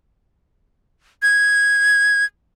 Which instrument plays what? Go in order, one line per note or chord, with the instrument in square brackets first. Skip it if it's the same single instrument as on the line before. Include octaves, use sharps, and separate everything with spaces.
[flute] G#6